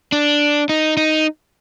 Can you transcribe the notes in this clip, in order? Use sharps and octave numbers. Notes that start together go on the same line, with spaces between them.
D4
D#4
D#4